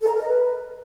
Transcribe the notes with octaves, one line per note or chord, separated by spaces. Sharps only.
A4
A#5
A#4
D#5
B4